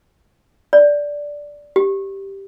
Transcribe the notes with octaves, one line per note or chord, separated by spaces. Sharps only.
D5
G4